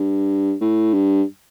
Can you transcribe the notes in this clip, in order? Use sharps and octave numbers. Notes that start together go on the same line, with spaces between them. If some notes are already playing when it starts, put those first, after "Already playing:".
Already playing: G2
A2
G2